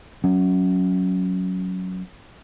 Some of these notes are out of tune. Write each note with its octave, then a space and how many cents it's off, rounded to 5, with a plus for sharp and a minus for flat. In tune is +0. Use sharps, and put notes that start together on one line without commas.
F#3 +0 C#4 +0